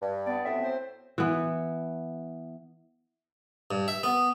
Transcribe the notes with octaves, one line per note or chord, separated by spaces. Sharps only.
G2
B3 D5
A2 F#3 C4 E5
C5
E3 B3
G2
E5
B3